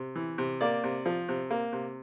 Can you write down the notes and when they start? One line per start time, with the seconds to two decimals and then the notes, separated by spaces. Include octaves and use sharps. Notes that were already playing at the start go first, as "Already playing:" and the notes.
Already playing: C3
0.16 E3
0.38 C3
0.61 A#3 D5
0.84 C3
1.06 F3
1.29 C3
1.50 A#3
1.73 C3